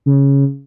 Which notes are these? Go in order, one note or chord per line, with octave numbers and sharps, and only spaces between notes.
C#3